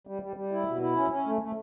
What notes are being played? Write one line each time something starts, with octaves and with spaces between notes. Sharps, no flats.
G3
G3
G3
E4
B2
E4
C#4
C#4
A3
A3